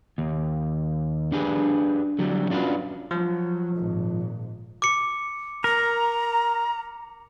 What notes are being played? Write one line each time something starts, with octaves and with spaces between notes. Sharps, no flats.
D#2
D4 G4 G#4 B4
D3 F#3 G3
C#4 D4 F4 F#4 B4
F3 F#3
G#1 A#2
D6 C#7
A#4 A#5